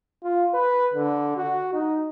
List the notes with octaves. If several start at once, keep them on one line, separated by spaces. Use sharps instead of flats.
F4
B4
D3
F#4
D#4